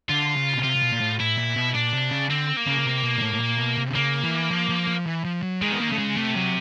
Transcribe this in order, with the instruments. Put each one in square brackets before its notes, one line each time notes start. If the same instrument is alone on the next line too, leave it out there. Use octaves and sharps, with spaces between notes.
[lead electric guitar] D3 [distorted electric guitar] F4
[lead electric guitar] C#3
B2
[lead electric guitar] C3 [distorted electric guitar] F4
[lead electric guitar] C3
B2
A#2
A2
[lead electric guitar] A2 [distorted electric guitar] E4
[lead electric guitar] A#2
B2
[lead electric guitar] A#2 [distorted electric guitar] D4
[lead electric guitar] C3
C#3
[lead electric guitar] D3 [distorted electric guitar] C4
[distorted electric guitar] A#3
[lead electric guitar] C#3
C#3
C3
B2
A#2
A2
A2
A#2
B2
C3
D3
[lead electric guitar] C#3 [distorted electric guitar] A#3
[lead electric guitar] E3
F3
F3
F3
E3
F3
F#3
[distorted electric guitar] D#3 [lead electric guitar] G#3
[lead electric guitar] B3
A#3
[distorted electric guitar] C#3 [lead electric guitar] A3
[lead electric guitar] G#3
[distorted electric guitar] C3 [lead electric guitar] A3
[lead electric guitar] F#3